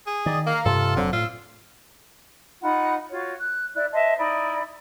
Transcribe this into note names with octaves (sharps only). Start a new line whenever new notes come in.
G#4
D#3 D5 D#5
A#3 A#4 F5
G2 C3 F4 A4
F1 D3 F#3 C4
A2 F4 E6
D#4 F4 F#5 B5
F4 F#4 C#5
F#6
E4 D5 F#6
C5 D#5 E5 A5
D#4 E4 D5 B5